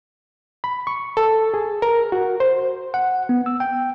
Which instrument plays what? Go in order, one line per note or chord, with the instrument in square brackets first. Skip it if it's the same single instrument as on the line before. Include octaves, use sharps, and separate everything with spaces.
[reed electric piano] B5
C#6
A4
G#4
A#4
F#4
C5
[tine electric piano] F#5
B3
E6
G5